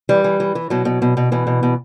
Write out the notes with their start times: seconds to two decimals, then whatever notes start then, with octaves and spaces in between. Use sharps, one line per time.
0.09 E3 G3
0.24 E3
0.40 E3
0.55 E3
0.70 B2 F#3
0.85 B2
1.02 B2
1.17 B2
1.32 B2 E3
1.47 B2
1.63 B2